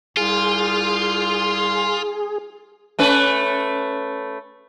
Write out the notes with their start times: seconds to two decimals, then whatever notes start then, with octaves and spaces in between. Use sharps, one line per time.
0.17 C2 F4 G#4
2.99 A3 C#4 B4